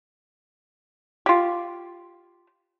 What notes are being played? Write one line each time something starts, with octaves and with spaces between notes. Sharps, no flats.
F4 G4